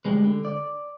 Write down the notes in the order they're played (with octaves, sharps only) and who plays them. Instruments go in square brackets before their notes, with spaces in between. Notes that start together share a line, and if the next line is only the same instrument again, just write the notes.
[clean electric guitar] D2 G3 G#3 B4
D3
D5